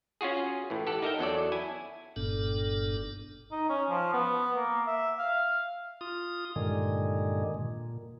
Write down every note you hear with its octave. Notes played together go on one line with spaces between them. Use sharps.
C#4 F4 F#4 G#4
A2 E3
G4 A4 F#5
D#4 A#4 E5 G5
E2 F#3 A4 D5
E4 G#5
G1 G2 A#2 B3 D4 A4
D#4
C#4
F3
B3
A#3
E5
F5
F4 D#6
G2 A#2 D3 D#3 G#3
A#2